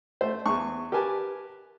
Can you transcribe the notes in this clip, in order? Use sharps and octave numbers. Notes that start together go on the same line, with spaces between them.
A3 C5
E2 C#6
G4 A#4 B4 G#5 A5